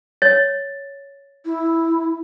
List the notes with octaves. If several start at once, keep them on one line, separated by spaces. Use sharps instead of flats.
C#5 A6
E4